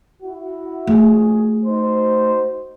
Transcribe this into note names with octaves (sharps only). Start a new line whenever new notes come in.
E4 F#4
A#1 A3 F#4 G#4
D#4 F#4 C5